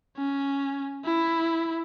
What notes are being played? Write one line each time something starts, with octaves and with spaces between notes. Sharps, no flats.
C#4
E4